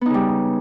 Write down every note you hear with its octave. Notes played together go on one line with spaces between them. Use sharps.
C#3 G3 B3 D#4